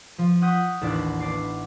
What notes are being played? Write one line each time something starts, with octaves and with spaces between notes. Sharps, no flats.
F3
F#5 C#6 D#6 F#6 G6 B6
A1 D#2 D4 E4 D5 F#6
B3 D4 D5 D6 C7